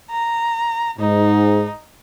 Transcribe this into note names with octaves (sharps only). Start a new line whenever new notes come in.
A#5
G#2 D#4